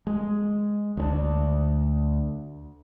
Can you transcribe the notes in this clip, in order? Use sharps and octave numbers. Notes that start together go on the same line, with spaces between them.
G#3
D2 C#4 D4